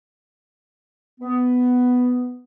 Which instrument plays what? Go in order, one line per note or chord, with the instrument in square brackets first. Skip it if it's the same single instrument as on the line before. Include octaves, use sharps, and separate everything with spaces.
[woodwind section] B3